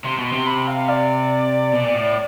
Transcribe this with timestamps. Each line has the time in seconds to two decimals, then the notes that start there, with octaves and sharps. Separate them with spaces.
0.05 C3 C6
0.18 B2
0.25 C6
0.33 C3
0.47 B5
0.67 F5
0.88 D5
1.73 B2
1.85 A#2
1.94 A2